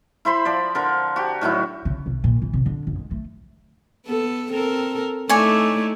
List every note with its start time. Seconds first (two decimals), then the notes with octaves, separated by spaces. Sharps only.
0.25 E4 C5 B5 C6
0.45 F3 D5
0.75 D3 A#4
1.16 F#4 G4
1.41 A2 D#3 F#3 E4
1.85 C#3
2.06 B1
2.24 A#2
2.42 E3
2.53 C3
2.66 D3
2.87 F#2
2.99 G#3
3.11 A3
4.06 B3 A4
4.51 C4 A4 A#4
5.29 A3 D#4 E4 C#5 D5 G#5